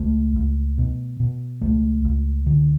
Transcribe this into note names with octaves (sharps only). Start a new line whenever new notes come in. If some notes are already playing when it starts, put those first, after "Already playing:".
Already playing: C#2 A3
C#2
B2
B2
C#2 A3
C#2
D3